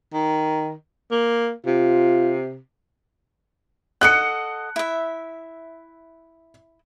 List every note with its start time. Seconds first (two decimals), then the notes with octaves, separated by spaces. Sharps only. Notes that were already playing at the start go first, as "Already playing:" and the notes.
0.13 D#3
1.11 A#3
1.66 C3 F4
4.01 A4 D#5 F#5 F#6 C#7
4.76 E4 E5